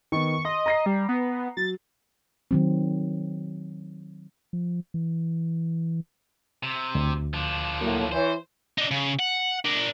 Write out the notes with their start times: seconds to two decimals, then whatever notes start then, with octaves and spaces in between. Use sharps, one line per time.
0.12 D#3 B3 C#6
0.45 D#5 C6
0.66 A#5 A#6 C7
0.86 G3
1.09 B3
1.57 F#3 A6
2.51 D#3 F#3 C4
4.53 F3
4.94 E3
6.63 C3
6.95 D2
7.33 F3 D4
7.81 A2 F#3 A#3
8.12 E3 C5 C#5
8.78 D4 D#4
8.91 C#3
9.19 F#5
9.65 D4 A#4